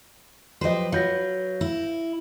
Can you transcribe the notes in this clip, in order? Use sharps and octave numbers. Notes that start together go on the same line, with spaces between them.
F3 F#3 G4 B4 C5 D#5
F#3 F4 B4 F5 G6 A#6
E4